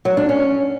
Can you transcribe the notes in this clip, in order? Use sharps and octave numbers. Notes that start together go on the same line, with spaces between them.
F#3
D4
C#4